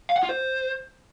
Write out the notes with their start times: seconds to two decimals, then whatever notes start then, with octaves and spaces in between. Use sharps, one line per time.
0.10 F5
0.16 F#5
0.23 F4
0.29 C5